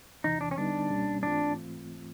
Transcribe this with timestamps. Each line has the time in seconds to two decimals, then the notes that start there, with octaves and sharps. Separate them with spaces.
0.24 E2 C3 E3 D#4
0.41 D4
0.51 C#4
0.57 D3 G3 B3 D4 D#4
0.90 C#2 B2 G3 A#3 C#4
1.23 G#2 E3 A3 C4 D4 F4